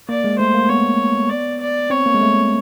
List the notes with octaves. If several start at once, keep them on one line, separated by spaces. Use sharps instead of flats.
A#3 D5
G#3
A3 C5
A#3
B3 C#5
D5
D5
C4 C#5
A#3
G#3
A3